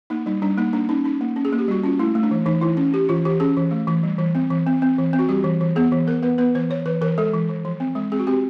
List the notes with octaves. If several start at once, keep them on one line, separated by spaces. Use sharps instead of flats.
A#3 D#4
G3 D#4
G3 D4
A#3 D#4
A#3 D4
C#4 D#4
C#4 D#4
A#3
C#4
G#4
A#3
G4
G3 F#4
C#4 F4
A3 E4
A3
D4
E3
E3 D#4
E3 E4
C#4
C#4 G4
E3 F4
E3 G4
C#4 G#4
E3
A3
E3
G3
E3
C4
E3
C4
C4
E3
C4
F#4
G3 G4
E3
E3
B3 G#4
E3
B3 A#4
B3 B4
B3 B4
E3 C5
E3 C#5
E3 B4
E3 A#4
G#3 A4
E3
E3
F3
C4
G#3
C4 G#4
F#4
C4 G4